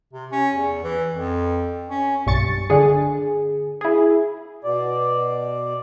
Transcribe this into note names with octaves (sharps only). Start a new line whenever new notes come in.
C3
C#4
E2
E3
F2
C#4
B1 G2 C#6 A6 C#7
D3 G#4
E4 G#4
B2 D5